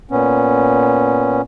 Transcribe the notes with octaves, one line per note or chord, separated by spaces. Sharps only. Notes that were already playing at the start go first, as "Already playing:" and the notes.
A#2 B3 C#4